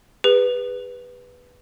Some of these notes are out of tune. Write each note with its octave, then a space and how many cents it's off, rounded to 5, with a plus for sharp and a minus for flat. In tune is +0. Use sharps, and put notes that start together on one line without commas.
G#4 -45 B4 +0